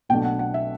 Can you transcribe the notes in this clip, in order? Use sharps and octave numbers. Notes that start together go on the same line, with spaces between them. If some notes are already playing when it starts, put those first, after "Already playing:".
B1 B2 F#3 A3 D4 G5
F#5
F#5
E5